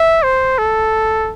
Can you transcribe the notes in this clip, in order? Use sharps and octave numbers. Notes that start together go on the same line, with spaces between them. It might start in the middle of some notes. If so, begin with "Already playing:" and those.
Already playing: E5
C5
A4